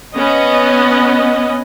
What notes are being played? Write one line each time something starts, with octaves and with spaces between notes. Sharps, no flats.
B3 C#4 D#5